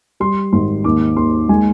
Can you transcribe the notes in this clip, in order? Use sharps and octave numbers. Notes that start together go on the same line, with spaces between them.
G3 C6
G#1 C6
D#2 D6
D#2 C6
G#3 G#5